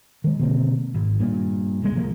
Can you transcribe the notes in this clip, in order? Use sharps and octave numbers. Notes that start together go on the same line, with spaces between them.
D#3 G#3
B2 D3 A#3 C4
G#1
G2 A#2
D#1 C2 C#3 G#3
C2 F3 A#3